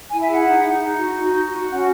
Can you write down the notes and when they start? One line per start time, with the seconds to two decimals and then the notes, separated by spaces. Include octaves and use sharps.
0.11 E4 G#5
0.20 E5
0.29 G#4 F#5
0.46 D#4
0.63 D#4
0.81 D#4
0.99 F#4
1.17 D#4
1.34 F#4
1.52 F#4
1.69 C#4 F#5